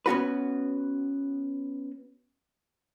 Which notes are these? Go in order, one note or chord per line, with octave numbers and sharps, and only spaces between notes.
B3 C#4 F#4 B4